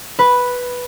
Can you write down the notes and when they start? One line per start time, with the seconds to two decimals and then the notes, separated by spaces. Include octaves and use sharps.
0.19 B4